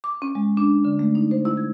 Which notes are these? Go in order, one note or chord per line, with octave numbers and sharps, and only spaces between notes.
D6
C#4
G#3
D4
D3
A3
D#4
C5
E4
G#6